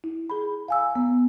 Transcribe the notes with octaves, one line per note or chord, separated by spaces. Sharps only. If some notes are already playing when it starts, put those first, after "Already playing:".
E4
G#4 B5
F5 G#5 E6
B3